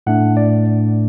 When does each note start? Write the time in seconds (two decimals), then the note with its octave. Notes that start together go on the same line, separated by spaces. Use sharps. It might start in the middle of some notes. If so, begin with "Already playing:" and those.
0.07 A2 A3 D4 F#5
0.37 D5